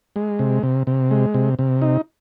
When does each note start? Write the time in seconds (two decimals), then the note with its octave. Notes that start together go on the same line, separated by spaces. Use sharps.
0.16 G#3
0.39 C3
0.63 C3
0.87 C3
1.11 G#3
1.34 C3
1.59 C3
1.82 D#4